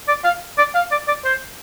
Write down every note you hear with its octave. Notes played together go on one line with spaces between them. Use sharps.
D5
F5
D5
F5
D5
D5
C5